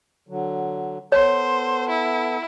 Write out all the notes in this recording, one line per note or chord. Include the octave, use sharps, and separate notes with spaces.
D3 F#3
B3 A4 C5 C#5
E4